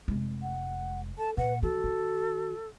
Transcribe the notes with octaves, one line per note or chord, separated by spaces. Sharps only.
F1 G#3
F#5
A4 A5
A#2 B4 F#5
E3 F#4 A4
D#3